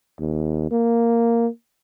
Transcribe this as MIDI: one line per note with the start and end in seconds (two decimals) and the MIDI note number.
0.20 0.66 39
0.71 1.47 58